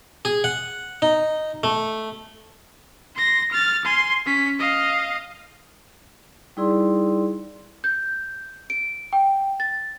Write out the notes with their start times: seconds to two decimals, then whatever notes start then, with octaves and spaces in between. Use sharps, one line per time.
0.25 G#4
0.44 F#5
1.02 D#4
1.63 A3
3.15 C6 A#6
3.51 F6 A6
3.85 G#5 C6
4.26 C#4 B6
4.59 D#5 F5
6.57 G3 D#4 E4 G#4 D5 C6
7.84 G6
8.70 D7
9.13 G5
9.60 A6